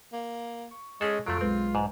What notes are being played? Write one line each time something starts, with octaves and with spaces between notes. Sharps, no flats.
A#3
C#6
G#3 C#4 G#4 A4
F2 F#3 A3 F4 A4 D7
B1 G#3 C4 B4
G#2